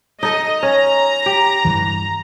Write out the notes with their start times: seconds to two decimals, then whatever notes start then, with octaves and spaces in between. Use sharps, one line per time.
0.23 D#4 A4 D#5
0.63 C#4 A#5
1.26 G4
1.65 G2 E3